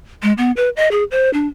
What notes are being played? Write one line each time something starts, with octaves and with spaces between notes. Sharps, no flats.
G#3
B3
B4
D#5
G#4
C5
D4